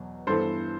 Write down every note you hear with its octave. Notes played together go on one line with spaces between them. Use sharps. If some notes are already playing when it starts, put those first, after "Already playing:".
Already playing: E2 B2 F#3
G2 E3 B3 A4 C5